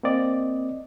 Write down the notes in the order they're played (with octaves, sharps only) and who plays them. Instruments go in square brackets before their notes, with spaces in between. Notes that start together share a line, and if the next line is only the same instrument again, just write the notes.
[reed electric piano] A#3 C4 D5 D#5